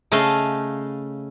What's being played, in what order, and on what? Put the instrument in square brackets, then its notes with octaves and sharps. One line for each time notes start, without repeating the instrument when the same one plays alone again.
[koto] C#3 A3 D#5 F5 A5